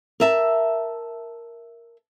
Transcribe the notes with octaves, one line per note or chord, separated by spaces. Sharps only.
A#4 E5 A5